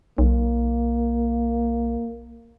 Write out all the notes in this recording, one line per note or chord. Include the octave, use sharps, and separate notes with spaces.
B1 A#3